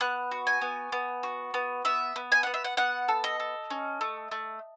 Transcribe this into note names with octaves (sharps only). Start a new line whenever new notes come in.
B3 F#6
F#4
G#5
B3
B3
F#4
B3
B3 E5
B3
G#5
B3 F#5
E5
F#5
B3 F#5
A4
D#5
A4
C#4
A3
A3